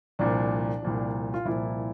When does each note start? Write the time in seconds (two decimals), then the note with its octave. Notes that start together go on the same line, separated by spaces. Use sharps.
0.19 C2 A#2 F3 D4
0.82 C2 A#2 F3
1.34 F4
1.45 C2 A#2 F3 E4